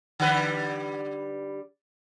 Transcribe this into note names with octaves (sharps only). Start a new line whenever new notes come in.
D3 G3 B4